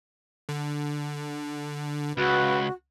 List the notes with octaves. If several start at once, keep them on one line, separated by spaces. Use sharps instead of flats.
D3
C#2 F#4 B4